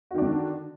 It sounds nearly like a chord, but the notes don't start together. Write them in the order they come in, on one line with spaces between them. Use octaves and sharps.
F#4 D#3 D4 D3